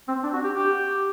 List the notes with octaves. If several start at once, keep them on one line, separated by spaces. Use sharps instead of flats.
C4
D4
F#4
G4
G4